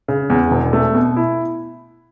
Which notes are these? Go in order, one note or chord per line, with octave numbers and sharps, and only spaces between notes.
C#3
E2
E1
A3
B2
E4